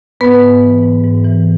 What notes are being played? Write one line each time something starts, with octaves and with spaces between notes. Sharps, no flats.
G#2 B3 B4
G#2
E3
G#2
G#2
E3